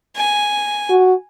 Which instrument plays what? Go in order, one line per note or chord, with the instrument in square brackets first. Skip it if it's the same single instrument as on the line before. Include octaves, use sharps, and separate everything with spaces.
[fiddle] G#5
[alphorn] F#4